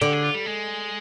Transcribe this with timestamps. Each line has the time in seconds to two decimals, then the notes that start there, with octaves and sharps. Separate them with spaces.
0.01 D3 G4
0.12 G#4
0.23 F4
0.34 G3
0.46 G#3